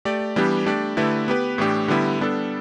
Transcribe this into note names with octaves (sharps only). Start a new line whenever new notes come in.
A3 G4 D5
E3 G3 B3 D4 G4
A3 D4 G4 D5
D3 A3 E4 G4 B4
B3 G4 B4
A2 E3 A3 D4 G4
D3 G3 B3 E4 G4
G3 B3 D4 A4